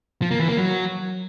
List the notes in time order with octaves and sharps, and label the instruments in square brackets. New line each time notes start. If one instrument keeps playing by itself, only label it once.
[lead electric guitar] F3
A#3
E3
A#3
F#3